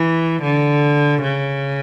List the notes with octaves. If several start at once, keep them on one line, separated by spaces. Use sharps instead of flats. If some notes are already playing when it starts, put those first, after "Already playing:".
Already playing: E3
D3
C#3